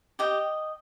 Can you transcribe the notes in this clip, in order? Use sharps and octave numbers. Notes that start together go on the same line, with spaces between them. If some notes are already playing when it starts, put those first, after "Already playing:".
G4 D#5 G5